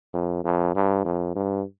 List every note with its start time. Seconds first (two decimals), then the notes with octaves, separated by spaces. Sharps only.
0.14 F2
0.44 F2
0.75 G2
1.05 F2
1.35 G2